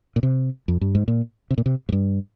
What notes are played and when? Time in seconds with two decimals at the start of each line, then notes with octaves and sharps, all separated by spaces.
0.16 A#2
0.23 C3
0.68 F2
0.81 G2
0.95 G#2
1.08 A#2
1.51 C3
1.58 A#2
1.66 C3
1.89 G#2
1.92 G2